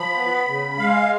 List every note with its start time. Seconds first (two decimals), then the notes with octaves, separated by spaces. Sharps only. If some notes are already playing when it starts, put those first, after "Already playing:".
Already playing: F3 B5
0.17 B3
0.48 C#3
0.78 G#3 F5